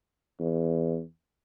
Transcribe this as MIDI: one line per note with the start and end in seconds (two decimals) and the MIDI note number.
0.40 1.02 40